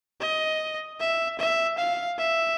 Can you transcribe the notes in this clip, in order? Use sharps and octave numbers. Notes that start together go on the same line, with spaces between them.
D#5
E5
E5
F5
E5